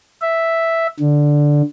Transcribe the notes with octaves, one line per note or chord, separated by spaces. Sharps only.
E5
D3